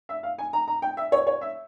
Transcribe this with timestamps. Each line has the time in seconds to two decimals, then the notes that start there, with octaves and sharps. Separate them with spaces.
0.09 E5
0.23 F5
0.38 G#5
0.53 A#5
0.68 A#5
0.82 G5
0.97 E5
1.12 C#5
1.27 C#5
1.41 E5